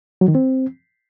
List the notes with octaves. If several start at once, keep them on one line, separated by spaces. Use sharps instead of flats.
F#3
D#3
C4